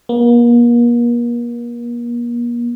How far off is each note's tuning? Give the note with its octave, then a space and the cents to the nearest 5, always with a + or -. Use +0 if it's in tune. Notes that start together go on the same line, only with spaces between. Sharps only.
A#3 +40